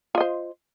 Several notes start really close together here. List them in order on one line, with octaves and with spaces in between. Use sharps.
F4 D#5 C5